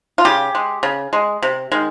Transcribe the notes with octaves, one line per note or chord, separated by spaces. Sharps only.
F4
C#3 G4
G#3
C#3
G#3
C3
D#3 G#3